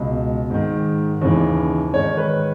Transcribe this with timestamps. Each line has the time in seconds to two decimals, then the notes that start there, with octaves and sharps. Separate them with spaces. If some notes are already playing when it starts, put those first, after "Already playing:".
Already playing: C#2 B2
0.50 G#2 D#3
1.22 D#2 C#3 E3
1.93 G#2 D#3 C#5
2.17 B4